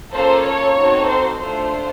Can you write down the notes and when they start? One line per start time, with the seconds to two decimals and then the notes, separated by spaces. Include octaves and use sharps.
0.14 A#3 C#4 F4 A4 C5
0.45 C#5
0.76 C4 D#4 F#4 A4
1.07 C5
1.38 A3 D4 F4 A4 C5